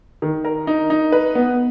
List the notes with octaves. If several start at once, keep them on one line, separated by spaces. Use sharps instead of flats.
D#3
A#4
D#4
D#4
B4
B3